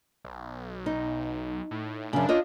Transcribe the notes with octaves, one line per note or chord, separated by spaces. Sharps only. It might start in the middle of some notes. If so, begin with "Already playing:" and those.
B1
D#4
A2
F#2 C#3 D4
F4 C#5 D#5